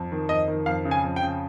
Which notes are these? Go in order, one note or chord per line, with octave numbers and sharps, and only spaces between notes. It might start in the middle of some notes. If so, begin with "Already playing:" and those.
Already playing: F2
D#3
F2 D#5
D#3
F2 F5
C#3
G#5
F2
G5
C#3